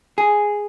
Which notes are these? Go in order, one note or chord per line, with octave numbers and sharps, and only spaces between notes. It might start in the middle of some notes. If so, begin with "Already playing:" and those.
G#4